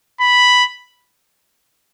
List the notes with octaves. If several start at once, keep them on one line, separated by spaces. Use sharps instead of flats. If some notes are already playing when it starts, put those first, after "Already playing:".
B5